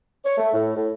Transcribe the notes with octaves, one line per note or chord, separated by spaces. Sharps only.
C#5
A3
A2
A2